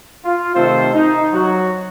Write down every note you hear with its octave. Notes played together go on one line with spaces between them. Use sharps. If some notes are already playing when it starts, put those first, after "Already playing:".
F4
C3 D#3 A3 C4 A4 C5
D#4
F#3 F#4